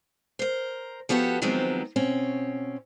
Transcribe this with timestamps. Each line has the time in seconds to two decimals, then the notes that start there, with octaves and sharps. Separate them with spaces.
0.39 A#4 C5
1.09 F3 B3 F#4 G4 A4
1.42 D#3 F3 F#3 G#3 B3 C4
1.96 B2 C4 C#4